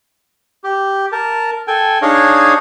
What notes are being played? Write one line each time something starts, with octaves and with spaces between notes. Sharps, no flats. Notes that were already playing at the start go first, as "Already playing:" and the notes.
G4
A#4 A5
A4 G5 G#5
D4 D#4 G#4 C#5 D#5 F5